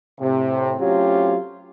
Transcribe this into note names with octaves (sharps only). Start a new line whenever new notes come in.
A2 C3
F#3 A3 C4 C#4 F4 G4